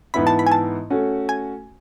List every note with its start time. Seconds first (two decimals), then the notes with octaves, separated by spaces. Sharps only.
0.14 G#2 E3 B3 E4 B5
0.27 A5
0.39 B5
0.47 G#5
0.52 A5
0.90 A3 C#4 F#4
1.29 G#5